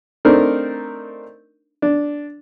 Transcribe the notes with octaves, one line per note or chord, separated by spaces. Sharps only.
A3 C4 D4 D#4 A#4
D4